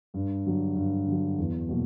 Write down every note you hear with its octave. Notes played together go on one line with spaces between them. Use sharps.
G2
D3 F#3
G2
D3 F#3
E2
B2 F#3 A#3